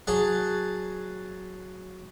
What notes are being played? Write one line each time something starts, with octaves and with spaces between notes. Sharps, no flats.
F#3 G#4 F#5 A5